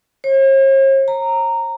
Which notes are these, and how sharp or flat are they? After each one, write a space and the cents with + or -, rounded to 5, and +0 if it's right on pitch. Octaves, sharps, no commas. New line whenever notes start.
C#5 -45
A#5 -10